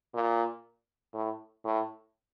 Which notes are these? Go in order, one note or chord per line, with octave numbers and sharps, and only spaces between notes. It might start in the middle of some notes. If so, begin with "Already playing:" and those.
A#2
A2
A2